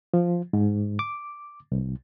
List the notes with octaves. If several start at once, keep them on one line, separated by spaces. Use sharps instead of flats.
F3
G#2
D6
C2